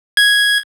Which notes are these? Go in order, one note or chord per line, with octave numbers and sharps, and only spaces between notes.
G#6